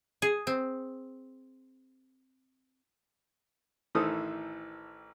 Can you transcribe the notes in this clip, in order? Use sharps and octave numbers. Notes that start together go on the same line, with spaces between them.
G#4
C4
A1 D#3 E3 A4 C5 D#6